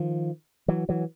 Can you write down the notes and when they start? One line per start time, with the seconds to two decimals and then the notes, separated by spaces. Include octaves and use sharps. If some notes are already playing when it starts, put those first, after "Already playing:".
Already playing: D#3 F3
0.68 E3 F#3
0.89 E3 F#3